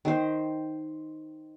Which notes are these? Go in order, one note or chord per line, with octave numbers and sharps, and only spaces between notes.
D#3 C5